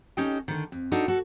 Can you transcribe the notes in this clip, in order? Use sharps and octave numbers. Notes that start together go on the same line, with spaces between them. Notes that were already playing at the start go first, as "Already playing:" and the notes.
C#4 D#4 G4 A4 D#5 G5
D3 D#3
F2
D4 D#4 F#4 A4
F#4 A4